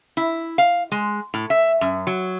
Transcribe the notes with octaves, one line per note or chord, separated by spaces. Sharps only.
E4
F5
G#3
A2
E5
F#2
F#3